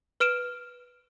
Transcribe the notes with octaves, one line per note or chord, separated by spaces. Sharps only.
B4 F6 D7 E7